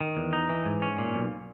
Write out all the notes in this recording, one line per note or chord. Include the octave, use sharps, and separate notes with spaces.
D#3
E2
D#4
E3
G#2
C#4
A#2
B1